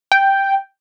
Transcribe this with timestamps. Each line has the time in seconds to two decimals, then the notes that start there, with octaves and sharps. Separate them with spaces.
0.12 G5